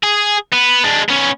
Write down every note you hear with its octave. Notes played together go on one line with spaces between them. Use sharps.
G#4
B3
G#3 D4
B3 C#4